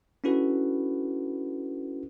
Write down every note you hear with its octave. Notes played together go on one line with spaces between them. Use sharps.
C#4 D4 E4 F#4 A4 B4